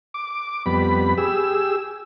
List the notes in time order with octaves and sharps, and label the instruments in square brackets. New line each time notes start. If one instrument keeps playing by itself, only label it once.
[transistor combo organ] D6
F2 G3 B3 B5
G4 G#4 E6